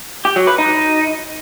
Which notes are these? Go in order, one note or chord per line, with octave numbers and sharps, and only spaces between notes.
G4
F#3
B4
D#4